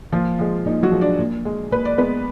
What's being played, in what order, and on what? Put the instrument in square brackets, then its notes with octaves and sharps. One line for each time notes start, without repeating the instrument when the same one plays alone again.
[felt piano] A#2 F3 F4
F3 G#3
A#2 D#4
F#3 F#4
F3 G#3
D4 D5
A#2
G#3
A#2 B4
D5
G#3 B3 B4